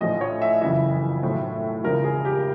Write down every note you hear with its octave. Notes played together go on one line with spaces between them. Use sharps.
A#1 A2 F3 D#5
C#5
E5
F#1 F2 C#3 E3 E5
B1 A2 F3
E1 E2 C#3 F3 A#4
G#4
G4